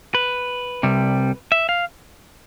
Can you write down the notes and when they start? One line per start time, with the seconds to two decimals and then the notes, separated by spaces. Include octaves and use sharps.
0.15 B4
0.83 C2 C3 G3
1.52 E5
1.69 F5